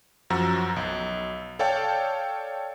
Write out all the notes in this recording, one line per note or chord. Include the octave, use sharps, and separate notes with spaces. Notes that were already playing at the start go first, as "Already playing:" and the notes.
F#2 F3 F#4 A#5 E6
B1
A4 C#5 D5 F5 G5 A5